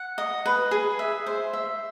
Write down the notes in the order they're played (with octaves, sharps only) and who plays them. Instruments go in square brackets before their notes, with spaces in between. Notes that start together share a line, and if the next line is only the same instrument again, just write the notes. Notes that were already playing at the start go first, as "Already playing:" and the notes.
Already playing: [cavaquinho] F#5
D#5
B4
G#4
E5
C5
E5